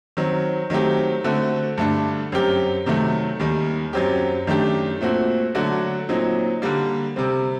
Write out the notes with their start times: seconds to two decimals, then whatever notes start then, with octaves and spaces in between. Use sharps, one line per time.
0.17 D#3 F#3 C4
0.70 D#3 F#3 A3 C4 G4
1.24 D3 A3 C4 F#4
1.78 G2 D3 A3 D4
2.32 F#2 F#3 C4 G4 A#4
2.86 C3 D#3 F#3 A3
3.39 D#2 D#3 G3
3.93 F#2 F#3 C4 G4
4.47 F#2 D#3 A3 D4 G4
5.01 A#2 A3 C4 F#4
5.55 D3 F#3 A3 D4 F#4
6.09 A#2 F#3 C4 D#4
6.62 D3 G3 A#3
7.16 C3 G3 C4